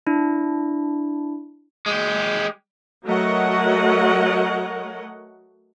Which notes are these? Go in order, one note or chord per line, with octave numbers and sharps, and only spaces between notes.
D4 E4
G#3 G4
F#3 A3 A#4 C#5 D#5 F#5